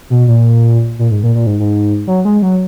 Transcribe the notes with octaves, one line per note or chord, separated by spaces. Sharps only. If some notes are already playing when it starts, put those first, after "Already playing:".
B2
A#2
A#2
G#2
A#2
A#2
G#2
G#2
F#3
G#3
F#3